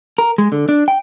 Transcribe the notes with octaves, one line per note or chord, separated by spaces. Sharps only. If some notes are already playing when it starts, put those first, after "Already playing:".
A#4
G#3
D3
D4
G5